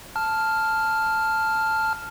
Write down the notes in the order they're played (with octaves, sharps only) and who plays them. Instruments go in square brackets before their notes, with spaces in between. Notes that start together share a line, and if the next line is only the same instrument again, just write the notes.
[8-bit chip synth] A5 F6